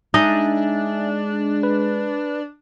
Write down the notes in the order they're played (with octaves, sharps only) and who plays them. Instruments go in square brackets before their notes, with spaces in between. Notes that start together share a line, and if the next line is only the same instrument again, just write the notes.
[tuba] G#3 [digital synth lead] D4 [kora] D#4 D#5 [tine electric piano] E5 G#5
[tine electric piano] B4